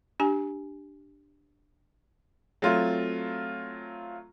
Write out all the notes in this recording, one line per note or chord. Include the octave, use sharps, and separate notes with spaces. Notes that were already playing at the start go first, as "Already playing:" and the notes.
D4 G4 G#5
F#3 A3 C4 F4